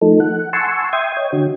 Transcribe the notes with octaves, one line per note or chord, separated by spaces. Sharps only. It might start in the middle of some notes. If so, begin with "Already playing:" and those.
F3 A3 D#4 A4
F#5
F#5 G#5 A5 C6 C#6 E6
E5 G5 C6 D#6 G#6
C#5 D#5 G5
D3 F#4